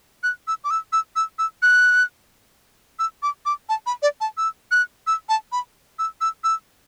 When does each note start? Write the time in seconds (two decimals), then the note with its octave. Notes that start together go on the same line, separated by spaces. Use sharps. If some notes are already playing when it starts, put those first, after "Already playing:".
0.23 F#6
0.48 E6
0.64 D6
0.70 E6
0.93 E6
1.16 E6
1.39 E6
1.62 F#6
2.99 E6
3.23 D6
3.46 D6
3.69 A5
3.86 B5
4.02 D5
4.21 A5
4.37 E6
4.71 F#6
5.07 E6
5.29 A5
5.52 B5
5.99 E6
6.21 E6
6.44 E6